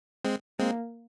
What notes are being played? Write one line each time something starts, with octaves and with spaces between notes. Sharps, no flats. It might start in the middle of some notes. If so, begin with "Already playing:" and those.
G#3 C4
G#3 A#3 C4